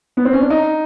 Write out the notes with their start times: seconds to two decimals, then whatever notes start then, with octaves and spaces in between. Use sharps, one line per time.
0.17 B3
0.25 C4
0.33 C#4
0.41 D4
0.50 D#4